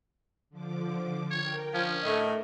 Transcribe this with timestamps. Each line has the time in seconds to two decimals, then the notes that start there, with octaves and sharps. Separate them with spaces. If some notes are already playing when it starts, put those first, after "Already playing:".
0.50 D3 F3 D6
1.31 A#4 C#5 G5
1.74 F3 C#4 D4
2.03 A2 A3 A#4 D#5